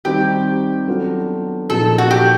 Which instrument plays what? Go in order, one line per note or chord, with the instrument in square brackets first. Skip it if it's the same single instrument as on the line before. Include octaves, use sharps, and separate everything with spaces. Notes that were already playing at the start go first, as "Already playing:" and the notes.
[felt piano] D#3 G3 C4 D#4 [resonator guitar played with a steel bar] G4
[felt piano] F#3 B3 D4 F4 A4
[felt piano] A#2 F3 A#3 D#4 G#4 [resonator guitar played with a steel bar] A4
[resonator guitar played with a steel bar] F#4
G4